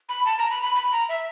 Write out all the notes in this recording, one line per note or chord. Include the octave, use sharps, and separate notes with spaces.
B5
A5
A#5
B5
B5
B5
A#5
E5